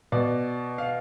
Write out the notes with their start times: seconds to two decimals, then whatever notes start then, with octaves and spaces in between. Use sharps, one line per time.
0.12 B2 D5
0.78 F5